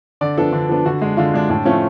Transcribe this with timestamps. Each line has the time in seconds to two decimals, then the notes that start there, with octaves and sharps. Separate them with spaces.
0.21 D3 D5
0.38 F3 B3 D4 A4
0.53 D3
0.69 F3 B3 D4
0.85 D3 F#4
1.02 G#3 D4
1.17 D3 F4
1.34 G#3 D4
1.50 A2 D4
1.65 F3 A3 C#4 F4